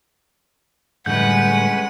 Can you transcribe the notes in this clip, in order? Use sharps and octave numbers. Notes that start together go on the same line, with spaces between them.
A2 D3 G3 G#3 C#4 B4 F#5 G6